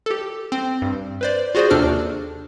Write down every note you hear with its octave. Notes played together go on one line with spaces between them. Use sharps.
G4 A4
C4
G2
B4 C5 D5
F4 F#4 G#4 C5 D5
D#2 C3 D4 A4 F6